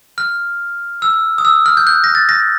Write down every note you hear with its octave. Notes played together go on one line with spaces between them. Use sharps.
F6
E6
D#6
E6
F6
G6
F#6
A#6
A6
A#6